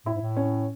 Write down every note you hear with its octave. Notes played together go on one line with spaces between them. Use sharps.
A2 E4
G#2
A2
C#4